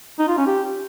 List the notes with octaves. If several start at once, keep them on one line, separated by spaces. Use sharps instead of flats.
D#4
F4
C#4
G4